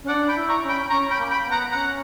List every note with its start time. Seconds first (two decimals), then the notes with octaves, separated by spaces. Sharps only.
0.03 C#4
0.08 D4 D5 F#5
0.29 G5 B5
0.35 E4
0.49 A#5 C#6
0.62 C#4
0.69 G5 B5
0.90 C#4 A#5 C#6
1.11 G5 B5
1.18 A#3
1.31 G5 B5
1.45 B3
1.52 F#5 A#5
1.72 C#4 F#5 A#5